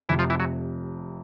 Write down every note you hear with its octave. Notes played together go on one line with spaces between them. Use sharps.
F1 F2 C3 E3 E4
F3 F4
E3 E4
F#3 F#4